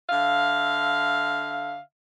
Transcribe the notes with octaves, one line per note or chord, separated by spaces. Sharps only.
D3 E5 F5